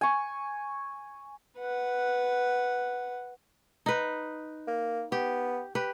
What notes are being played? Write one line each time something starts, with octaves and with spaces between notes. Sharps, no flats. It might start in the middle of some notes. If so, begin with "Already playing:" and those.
G#5 C#6
B4 F#5
D#4 B4
A#3
B3 G4
G4 B4